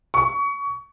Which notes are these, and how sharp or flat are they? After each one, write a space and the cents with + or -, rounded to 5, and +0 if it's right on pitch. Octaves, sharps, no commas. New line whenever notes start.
C#6 +25